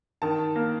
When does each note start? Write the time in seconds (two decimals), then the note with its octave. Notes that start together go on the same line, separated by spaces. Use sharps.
0.22 D#3 A5
0.56 A#3